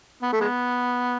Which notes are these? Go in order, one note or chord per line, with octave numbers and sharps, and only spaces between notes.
B3
A3
G#3 B3